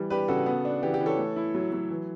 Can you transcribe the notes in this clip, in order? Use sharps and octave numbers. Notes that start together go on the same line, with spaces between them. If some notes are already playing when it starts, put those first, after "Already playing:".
Already playing: E3 G3
D4 G4 B4
C#3 F#4 A4
B3
D4
E3 G4
G4
E3
A4 C#5
A3
E4
F#3
F#3
E3